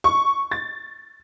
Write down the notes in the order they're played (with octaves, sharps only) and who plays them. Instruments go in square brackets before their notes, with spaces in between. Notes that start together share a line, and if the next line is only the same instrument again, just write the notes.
[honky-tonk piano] C#6
A6